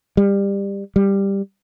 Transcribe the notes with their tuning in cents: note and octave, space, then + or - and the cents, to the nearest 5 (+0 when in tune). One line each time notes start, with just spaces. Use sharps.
G3 +20
G3 +10